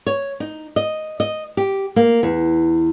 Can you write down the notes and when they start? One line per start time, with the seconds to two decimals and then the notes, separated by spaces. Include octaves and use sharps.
0.07 C#5
0.40 D#4
0.76 D#5
1.20 D#5
1.57 G4
1.96 A#3
2.23 E2